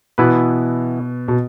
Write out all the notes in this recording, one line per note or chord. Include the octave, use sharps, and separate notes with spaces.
B2 E3 B3 E4 B4
B2